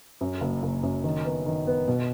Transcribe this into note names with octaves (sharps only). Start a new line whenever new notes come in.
F#2
F#1
F#1
F#2
D#3
B3
D#3
B3
B2